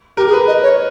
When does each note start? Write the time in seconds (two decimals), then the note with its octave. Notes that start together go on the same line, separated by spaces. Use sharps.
0.17 G4 A#4
0.27 G#4
0.33 B4
0.48 D#5
0.62 C#5